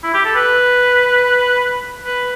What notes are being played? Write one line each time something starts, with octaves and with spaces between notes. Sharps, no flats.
E4
G4
A4
B4
B4